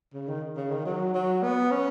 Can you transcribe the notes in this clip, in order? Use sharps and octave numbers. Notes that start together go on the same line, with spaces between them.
C#3
D#3
C#3
D#3
F#3
F#3
B3
C#4